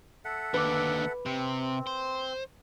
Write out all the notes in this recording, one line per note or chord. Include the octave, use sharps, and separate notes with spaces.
A4 E5 F#5
D#2 D3 B4 D6
C3 C4
C5